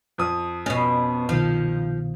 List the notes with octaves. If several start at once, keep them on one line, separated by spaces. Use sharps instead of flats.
F2 D#6
B2 C#4
C2 B2 D#3 F3